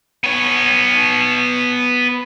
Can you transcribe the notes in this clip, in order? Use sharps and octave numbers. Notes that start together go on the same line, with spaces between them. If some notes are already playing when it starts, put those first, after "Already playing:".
B3 C#5